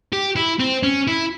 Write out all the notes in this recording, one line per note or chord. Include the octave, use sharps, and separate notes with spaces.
G4
E4
C4
C#4
E4